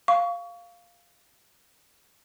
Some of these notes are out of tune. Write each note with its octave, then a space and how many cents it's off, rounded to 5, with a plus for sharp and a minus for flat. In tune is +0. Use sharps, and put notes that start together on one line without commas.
F5 +0 C#6 +30